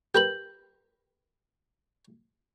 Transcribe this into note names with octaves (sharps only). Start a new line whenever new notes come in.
G4 A#4 B4 G6 F#7